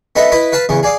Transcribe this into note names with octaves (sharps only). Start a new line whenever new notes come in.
B3 D#4 A4 B4 D#5 E5
E4 B4 D#5 B5 D#6
B4 F5 A5 B5
E2 C#3 E3
G#4 D5 F5 D#6